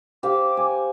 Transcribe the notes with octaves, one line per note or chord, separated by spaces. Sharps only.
G4 C5 F5 D6
G#5